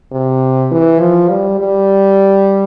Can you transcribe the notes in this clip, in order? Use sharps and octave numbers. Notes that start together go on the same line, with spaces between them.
C3
E3
F3
G3
G3